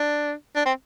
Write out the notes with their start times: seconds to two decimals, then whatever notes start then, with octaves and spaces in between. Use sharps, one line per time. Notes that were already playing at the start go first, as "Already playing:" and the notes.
Already playing: D4
0.56 D4
0.66 C4